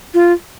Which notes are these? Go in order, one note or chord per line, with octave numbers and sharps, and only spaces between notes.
F4